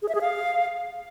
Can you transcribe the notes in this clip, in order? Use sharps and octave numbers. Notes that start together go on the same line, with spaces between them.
G#4
E5
G#4
F5